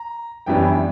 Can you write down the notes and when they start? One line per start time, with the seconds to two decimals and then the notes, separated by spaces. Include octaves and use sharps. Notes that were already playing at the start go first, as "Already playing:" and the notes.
Already playing: A#5
0.46 F#2 E3 G3 B3 D4 G5